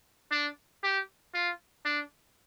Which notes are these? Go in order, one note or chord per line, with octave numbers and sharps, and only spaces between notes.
D4
G4
F4
D4